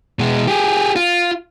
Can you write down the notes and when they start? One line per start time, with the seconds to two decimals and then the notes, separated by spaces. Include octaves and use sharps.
0.19 B2 G#3
0.48 G4 G#4
0.96 F4